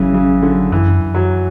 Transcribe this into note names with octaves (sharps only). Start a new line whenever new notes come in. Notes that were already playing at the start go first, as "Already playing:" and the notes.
Already playing: G#1 C#3 E3 F#3
C#3 F#3
D3 F#3
F#2 E3
F#2
F#3